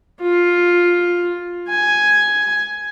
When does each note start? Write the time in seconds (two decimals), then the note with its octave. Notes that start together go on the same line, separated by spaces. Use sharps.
0.21 F4
1.70 G#5